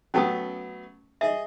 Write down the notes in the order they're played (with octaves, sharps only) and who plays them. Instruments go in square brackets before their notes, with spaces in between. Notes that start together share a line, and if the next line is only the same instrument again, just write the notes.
[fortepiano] F#3 A3 B3 [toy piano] C#4 A5 D#6
[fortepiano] G#4 D#5 [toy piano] E5